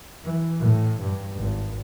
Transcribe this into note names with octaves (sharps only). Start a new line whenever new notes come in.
E3
A2
G2
G#1